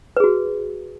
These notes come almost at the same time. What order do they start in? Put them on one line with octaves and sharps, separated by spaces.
B4 G#4 F#4